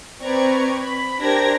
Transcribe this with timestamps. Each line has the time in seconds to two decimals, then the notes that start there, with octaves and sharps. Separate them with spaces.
0.21 C4 B4 D5 A#5 C#6 G#6
0.82 B5
1.21 D4 G4 A#4 C5 G#6 A#6